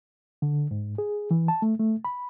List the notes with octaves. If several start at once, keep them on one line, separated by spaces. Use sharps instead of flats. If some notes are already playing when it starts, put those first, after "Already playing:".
D3
G#2
G#4
E3
A5
A3
A3
B5